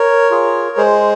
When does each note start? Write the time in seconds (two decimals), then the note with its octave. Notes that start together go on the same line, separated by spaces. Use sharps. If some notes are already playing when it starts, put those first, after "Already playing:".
Already playing: A#4 C#5
0.31 F4 G#4
0.77 G#3 G#4 C5